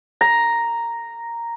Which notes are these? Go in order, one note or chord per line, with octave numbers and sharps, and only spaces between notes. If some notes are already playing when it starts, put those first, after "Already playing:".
A#5